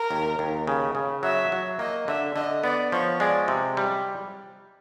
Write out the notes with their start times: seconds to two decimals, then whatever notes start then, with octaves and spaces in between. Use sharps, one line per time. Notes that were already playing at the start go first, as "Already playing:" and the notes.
Already playing: A#4
0.11 D#2
0.39 D#2
0.67 C#3
0.95 C#3
1.23 F#3 E5
1.52 F#3
1.79 A#3 D#5
2.08 D3 E5
2.36 D3 D#5
2.64 B3 D5
2.92 F3 C#5
3.20 G#3 D5
3.48 C3
3.77 G3